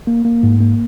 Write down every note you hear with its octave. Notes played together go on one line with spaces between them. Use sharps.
A#3
A#3
G#2
A#3